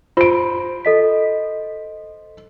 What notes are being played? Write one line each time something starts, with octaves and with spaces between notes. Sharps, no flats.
F4 C5 B5 D7
A4 D#5 B6